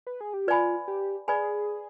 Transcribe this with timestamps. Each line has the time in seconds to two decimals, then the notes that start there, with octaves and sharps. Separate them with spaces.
0.07 B4
0.21 G#4
0.33 G4
0.47 F4 B4 D5 G#5 B5
0.88 G4
1.28 G#4 B4 D5 G#5 B5